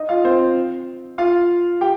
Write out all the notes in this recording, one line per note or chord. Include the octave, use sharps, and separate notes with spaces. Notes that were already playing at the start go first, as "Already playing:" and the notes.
Already playing: D#4 D#5
F4 F5
C4 C5
F4 F5
G4 G5